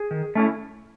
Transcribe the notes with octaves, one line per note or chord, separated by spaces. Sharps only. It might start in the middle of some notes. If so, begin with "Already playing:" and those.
Already playing: G#4
D#3
A3 C#4 E4